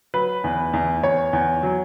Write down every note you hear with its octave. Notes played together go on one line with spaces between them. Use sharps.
F#3 B4
E2
E2
E2 C#5
E2
F#3